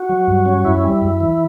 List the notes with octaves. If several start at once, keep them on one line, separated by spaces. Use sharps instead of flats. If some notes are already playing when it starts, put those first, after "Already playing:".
Already playing: F#4
F#3
G2
C#4
F#2 E4
G3
F#2
E3